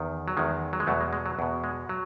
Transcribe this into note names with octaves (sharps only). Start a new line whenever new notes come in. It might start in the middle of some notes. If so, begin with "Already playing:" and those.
Already playing: E2 D#3
F#3
E2 D#3 G#3
F#3
G#3
E2 B2 F#3 A3
G#3
G#3
F#3
E2 B2
G#3
F#3